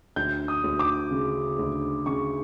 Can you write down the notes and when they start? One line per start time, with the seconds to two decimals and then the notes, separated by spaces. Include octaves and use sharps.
0.16 D2 G6
0.48 D#6
0.64 D2
0.79 D6
1.11 C#3
1.59 D2
2.06 C#3 C#6